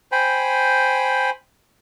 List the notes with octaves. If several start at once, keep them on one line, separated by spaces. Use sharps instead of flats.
C5 G5 G#5 B5